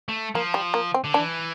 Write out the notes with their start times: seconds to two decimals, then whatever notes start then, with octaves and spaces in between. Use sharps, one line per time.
0.09 A3
0.35 F3 A#3
0.54 G3
0.74 A#3
0.94 C4
1.04 D3
1.14 E3 D4